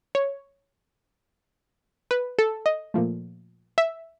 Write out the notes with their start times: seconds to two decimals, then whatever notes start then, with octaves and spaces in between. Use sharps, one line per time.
0.15 C#5
2.11 B4
2.39 A4
2.66 D#5
2.94 A#2 F3 A3
3.78 E5